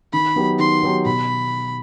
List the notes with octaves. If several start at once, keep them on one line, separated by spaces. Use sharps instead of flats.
D#3 B5
F#3 B3 D#4 G4
D#3 C6
F#3 B3 D#4 G4
B2 B5